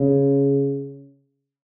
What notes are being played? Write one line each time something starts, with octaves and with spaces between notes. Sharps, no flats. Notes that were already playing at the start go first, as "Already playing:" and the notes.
Already playing: C#3